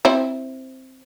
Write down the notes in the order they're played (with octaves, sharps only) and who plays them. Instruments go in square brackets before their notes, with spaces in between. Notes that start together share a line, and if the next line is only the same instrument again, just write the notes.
[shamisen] C4 E4 C5